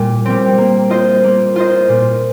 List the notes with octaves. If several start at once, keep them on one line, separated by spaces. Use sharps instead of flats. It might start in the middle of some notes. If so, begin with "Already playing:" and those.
Already playing: A#2 G3
G3 C4
A#3
F4 C5 D#5
A#3
F4 C5 D#5
A#2